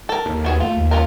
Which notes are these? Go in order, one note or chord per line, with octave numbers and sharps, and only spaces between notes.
A4 A#4
D#2
B3 F#4 G#4
A3 F4
D#2
C#4 F4 A#4